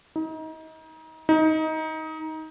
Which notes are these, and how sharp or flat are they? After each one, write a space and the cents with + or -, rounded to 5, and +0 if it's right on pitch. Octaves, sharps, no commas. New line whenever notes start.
D#4 +30
D#4 +20